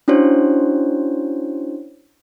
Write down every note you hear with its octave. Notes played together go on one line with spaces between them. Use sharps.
C#4 D4 E4 F#4 C5 C#5